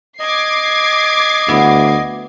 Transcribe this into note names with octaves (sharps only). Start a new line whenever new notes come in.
D#5 D6 G#6 C7
D2 B3 E4